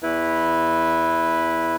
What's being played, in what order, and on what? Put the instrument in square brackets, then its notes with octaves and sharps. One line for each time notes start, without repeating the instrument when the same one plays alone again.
[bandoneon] E2 E4 B4